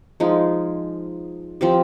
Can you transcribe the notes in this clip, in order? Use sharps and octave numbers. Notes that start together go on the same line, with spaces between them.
F3 G#3 D#4
F3 C4 G4